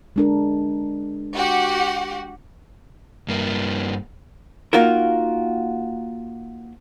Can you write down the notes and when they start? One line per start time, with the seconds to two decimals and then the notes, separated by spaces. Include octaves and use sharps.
0.16 G#3 D4 A#4
1.34 F#4 G4 F#5
3.28 G2 A#3
4.73 A#3 D#4 F4 F#4 A#4